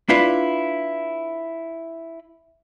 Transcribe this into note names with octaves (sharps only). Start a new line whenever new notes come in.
D4 E4 F4 B4